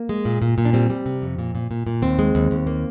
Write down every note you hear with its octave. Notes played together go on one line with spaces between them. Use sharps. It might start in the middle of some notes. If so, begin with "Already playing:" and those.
Already playing: A#3
G#3
A#2
A#2
A#2
D4
G3 C4
G3
C3
F2
A#2
A#2
A#2
A#2
D#2 C4
G#3
D#2
D#2
A#3